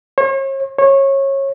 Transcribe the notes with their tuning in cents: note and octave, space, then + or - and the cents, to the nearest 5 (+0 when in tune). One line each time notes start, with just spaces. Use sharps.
C#5 -40
C#5 -20